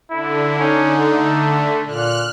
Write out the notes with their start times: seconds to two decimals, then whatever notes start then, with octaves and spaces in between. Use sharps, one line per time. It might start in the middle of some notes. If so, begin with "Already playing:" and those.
0.10 D3 E4
0.59 C#4 D#4
1.14 A3
1.87 A#2 F6 F#6